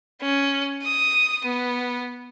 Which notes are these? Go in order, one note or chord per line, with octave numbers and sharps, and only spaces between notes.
C#4
D#6
B3